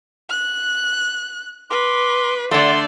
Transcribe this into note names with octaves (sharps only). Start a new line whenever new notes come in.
F#6
B4 C6 D6
D3 A3 D5 C6